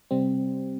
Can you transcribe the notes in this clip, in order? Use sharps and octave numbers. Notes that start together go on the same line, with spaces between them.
C3 G3 C4